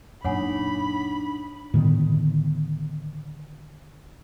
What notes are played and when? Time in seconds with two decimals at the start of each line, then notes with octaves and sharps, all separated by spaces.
0.24 F#2 A#2 D4 D#4 C#5 F#5 G#5 B5
1.74 A2 D3 D#3 B3